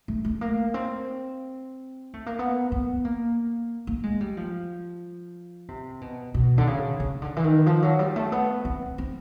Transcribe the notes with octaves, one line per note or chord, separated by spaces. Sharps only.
A3
A3
A#3
C4
A3
A#3
B3
B3
A#3
A#3
G#3
G3
F3
C3
B2
B2
D3
C#3
C#3
D3
E3
D#3
F3
F#3
G3
A3
B3
C4
C4